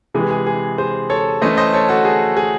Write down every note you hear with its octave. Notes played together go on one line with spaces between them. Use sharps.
C3 E3 G#3 G#4
G#4
G#4
G#4 C5
A4 C#5
E3 A3 C#4 C5 D#5
C5 D#5
A4 C#5
F#4 A4
G#4
G#4